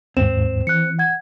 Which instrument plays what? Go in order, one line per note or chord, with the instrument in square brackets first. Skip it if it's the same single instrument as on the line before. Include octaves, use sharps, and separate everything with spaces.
[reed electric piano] D#2 G#2 [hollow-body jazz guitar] C4 [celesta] E7
[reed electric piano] E3 [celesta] F#6 C#7
[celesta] F#5 G#6